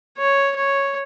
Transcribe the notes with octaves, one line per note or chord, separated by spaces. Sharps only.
C#5
C#5